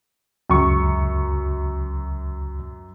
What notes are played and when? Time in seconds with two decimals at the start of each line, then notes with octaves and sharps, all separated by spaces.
0.50 C#2 F#2 C#6